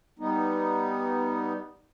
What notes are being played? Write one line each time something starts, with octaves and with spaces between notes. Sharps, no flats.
G3 B3 D#4